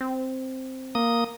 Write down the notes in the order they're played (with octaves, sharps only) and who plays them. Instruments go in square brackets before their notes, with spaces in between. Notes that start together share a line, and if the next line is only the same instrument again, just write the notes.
[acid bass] C4
[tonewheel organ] A#3 D#6